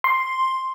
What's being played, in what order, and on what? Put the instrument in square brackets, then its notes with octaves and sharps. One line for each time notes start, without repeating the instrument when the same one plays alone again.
[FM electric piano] C6